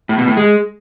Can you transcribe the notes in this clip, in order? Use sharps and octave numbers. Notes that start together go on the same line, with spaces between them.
A2
B2
A2
G#3